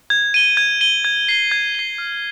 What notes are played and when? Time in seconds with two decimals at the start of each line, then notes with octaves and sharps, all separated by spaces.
0.10 G#6
0.34 D#7 G7
0.57 G#6
0.81 D#7 G7
1.05 G#6
1.29 C7 G7
1.51 G#6
1.75 C7 G7
1.98 F6